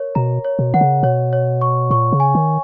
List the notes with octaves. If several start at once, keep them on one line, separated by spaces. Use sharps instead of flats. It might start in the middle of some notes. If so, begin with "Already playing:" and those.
Already playing: A#4 C#5
B2 A#5
C#5
B2
D#3 F#5
C#3
B2 C#5
C#5
C#6
A#2 C#6
C#3
G#5
D#3